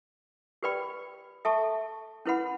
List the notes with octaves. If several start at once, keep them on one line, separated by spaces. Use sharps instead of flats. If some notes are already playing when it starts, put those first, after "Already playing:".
G4 B4 D5 G5 B5
A4 E5 A5 C#6
C#4 E4 B4 F#5 B5